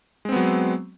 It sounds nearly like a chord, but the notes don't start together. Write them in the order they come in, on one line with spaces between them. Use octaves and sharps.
G#3 C4 B3 F#3